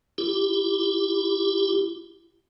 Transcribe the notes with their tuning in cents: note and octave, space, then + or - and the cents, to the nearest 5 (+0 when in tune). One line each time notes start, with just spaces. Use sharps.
E4 +15 G4 +0